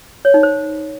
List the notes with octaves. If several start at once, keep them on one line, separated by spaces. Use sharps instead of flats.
C#5
D#4
C5